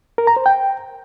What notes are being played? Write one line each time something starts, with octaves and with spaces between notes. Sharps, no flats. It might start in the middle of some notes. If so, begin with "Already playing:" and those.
A#4
A#5
C5
G5